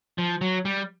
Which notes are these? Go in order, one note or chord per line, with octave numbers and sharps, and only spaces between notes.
F3
F#3
G3